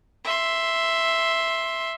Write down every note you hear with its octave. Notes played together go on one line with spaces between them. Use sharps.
E5 C6